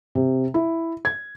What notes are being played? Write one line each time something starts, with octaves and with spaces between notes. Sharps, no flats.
C3
E4
G#6